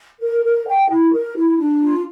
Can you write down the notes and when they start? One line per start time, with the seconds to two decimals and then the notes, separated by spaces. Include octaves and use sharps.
0.21 A#4
0.44 A#4
0.67 G5
0.89 E4
1.12 A#4
1.36 E4
1.58 D4
1.81 F4